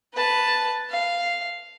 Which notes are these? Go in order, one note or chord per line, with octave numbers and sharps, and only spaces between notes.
B4 A5
F5